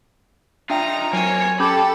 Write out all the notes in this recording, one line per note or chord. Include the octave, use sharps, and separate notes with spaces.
D4 D#4 F4 E5 G5 A#5
F#3 A#3 C4 C#5 G#5
C#4 G4 A4 B5